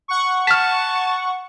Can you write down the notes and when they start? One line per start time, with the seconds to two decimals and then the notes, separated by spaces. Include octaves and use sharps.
0.08 F#5 C#6
0.47 A5 F6 B6